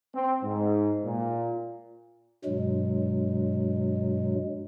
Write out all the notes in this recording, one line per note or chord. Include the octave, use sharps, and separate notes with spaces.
C4
G#2
A#2
G2 B2 F#3 G#3